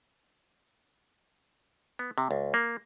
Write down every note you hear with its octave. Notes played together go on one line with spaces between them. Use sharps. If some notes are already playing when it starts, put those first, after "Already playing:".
B3
C3
C#2
A#3